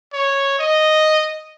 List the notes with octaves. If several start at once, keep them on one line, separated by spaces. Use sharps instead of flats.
C#5
D#5